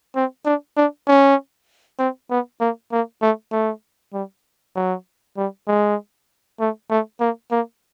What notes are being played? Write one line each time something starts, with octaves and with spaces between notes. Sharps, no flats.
C4
D4
D4
C#4
C4
B3
A#3
A#3
A3
A3
G3
F#3
G3
G#3
A3
A3
A#3
A#3